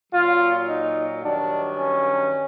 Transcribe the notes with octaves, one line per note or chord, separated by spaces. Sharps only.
A#2 F#3 F4
D#4
G2 D#3 F#3 D4
C#4